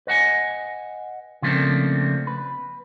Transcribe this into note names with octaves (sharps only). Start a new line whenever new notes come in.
B4 D#5 F#5 G#5
C#3 F3 A3 A#3 C4 D4
B4